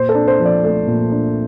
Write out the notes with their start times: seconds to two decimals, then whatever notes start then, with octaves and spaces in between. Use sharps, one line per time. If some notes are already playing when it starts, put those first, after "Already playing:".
Already playing: A#2 C5
0.09 A4
0.15 D4
0.28 C5
0.40 F3
0.45 D5
0.64 A3
0.87 A#2
1.11 D4